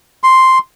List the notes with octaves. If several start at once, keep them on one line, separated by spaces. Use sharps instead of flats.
C6